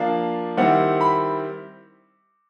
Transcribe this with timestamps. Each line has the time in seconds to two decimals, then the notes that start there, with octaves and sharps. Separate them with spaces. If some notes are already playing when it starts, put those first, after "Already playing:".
Already playing: F3 A#3 D4 F5
0.57 D#3 G3 C4 E4 F#5
1.01 B5